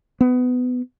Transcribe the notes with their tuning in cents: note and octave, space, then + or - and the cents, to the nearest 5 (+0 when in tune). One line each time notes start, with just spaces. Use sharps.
B3 +20